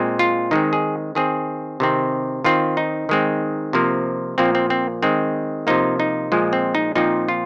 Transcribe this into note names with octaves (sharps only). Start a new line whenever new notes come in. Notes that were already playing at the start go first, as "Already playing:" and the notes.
Already playing: A#2 G#3 C4
F4
D#3 G#3 C4 D#4
G#4
D#3 C4 G#4
C3 D#3 C4
D#3 C4 F4
D#4
D#3 G#3 C4
C3 F3 A#3
A#2 F3 A#3 C4
C4
C4
D#3 G#3 C4
C3 F3 A#3 D#4
D#4
A#2 F3 G#3
C4
D#4
A#2 F3 C4 D#4
F4